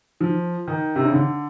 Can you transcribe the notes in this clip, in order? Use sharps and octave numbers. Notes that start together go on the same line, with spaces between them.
F3
D#3
C3
C#3
D3